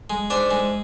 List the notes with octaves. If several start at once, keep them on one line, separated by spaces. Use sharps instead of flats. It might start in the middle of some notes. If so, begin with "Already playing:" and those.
G#3
G#2 D4 D5
G#3